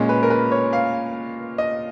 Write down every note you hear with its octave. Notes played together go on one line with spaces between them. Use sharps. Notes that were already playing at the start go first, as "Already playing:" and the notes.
Already playing: A#2 G#3 C#4
B4
A#4
B4
C#5
F5
D#5